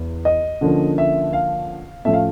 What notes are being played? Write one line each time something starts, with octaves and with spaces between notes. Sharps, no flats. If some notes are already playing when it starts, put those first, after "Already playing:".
Already playing: E2
D#5
D3 F3 A#3 C#4
E5
F5
A2 F3 A3 C#4 E5
F5